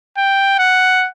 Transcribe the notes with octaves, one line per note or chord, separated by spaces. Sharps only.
G5
F#5